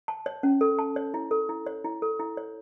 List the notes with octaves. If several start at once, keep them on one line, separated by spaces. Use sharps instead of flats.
A5
C#5
C#4
A4
A5
C#5
E4
A4
E4
C#5
E4
A4
E4
C#5